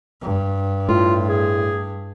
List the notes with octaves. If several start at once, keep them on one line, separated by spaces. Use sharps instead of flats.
G2
A2 F4
G#4